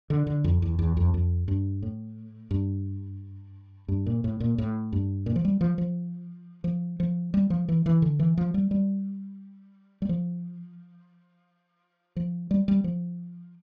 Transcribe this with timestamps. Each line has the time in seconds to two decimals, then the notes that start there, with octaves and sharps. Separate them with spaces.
0.10 D3
0.27 D3
0.44 F2
0.62 E2
0.79 E2
0.97 F2
1.14 F2
1.48 G2
1.82 A2
2.51 G2
3.88 G2
4.06 A#2
4.24 A2
4.40 A#2
4.58 A2
4.92 G2
5.26 A#2
5.36 F3
5.45 G3
5.61 F3
5.78 F3
6.64 F3
7.00 F3
7.34 G3
7.50 F3
7.69 E3
7.86 E3
8.02 D3
8.19 E3
8.37 F3
8.54 G3
8.71 G3
10.02 G3
10.09 F3
12.16 F3
12.51 G3
12.68 G3
12.84 F3